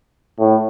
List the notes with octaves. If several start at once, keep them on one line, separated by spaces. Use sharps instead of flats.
A2